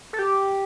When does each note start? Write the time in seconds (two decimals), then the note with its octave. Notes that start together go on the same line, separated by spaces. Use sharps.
0.13 A4
0.19 G4